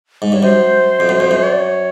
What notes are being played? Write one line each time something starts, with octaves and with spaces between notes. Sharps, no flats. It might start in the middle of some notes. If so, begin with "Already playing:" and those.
G#2
G2 C#5
F#2 C5
F2
F#2
F2
F#2
C#5
D5
C#5